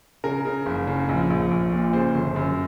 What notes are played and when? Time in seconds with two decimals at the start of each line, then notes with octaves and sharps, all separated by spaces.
0.24 C#3 A#4
0.45 C#3
0.66 F#1
0.87 C#3
1.09 A#1
1.30 A#1
1.51 A#1
1.72 A#2
1.93 C#3 C5
2.15 G1
2.36 F#2